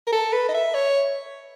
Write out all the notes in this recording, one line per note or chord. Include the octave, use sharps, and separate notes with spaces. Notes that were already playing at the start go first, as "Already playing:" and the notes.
A#4
A4
B4
D#5
E5
C#5